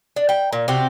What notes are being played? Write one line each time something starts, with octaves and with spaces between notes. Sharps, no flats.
D4
G5
A#2
C3 F#4 G4